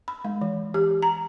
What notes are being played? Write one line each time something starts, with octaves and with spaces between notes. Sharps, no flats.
B5
G#3
E3
G4
A#5